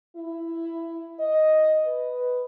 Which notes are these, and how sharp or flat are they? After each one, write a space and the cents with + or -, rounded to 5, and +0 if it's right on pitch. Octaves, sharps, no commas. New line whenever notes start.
E4 +10
D#5 +0
B4 +5